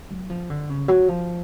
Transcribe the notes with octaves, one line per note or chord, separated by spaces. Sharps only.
F#3
F3
D3
C#3
F#3
F3